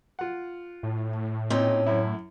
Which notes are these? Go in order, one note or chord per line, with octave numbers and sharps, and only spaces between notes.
F4 F#5
A2
A#2 C4 C#4 D#4 C6
F#2 E4